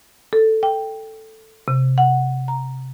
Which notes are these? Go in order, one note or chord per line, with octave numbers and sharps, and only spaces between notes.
A4
G5
C3
F#5
A#5